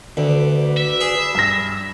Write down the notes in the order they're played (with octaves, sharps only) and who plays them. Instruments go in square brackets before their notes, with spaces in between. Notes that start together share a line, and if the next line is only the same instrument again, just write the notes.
[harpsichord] D2 [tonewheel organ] F#4 B4 D5
[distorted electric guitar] E5
[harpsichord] G#4
[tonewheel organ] B5
[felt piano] G2 A#6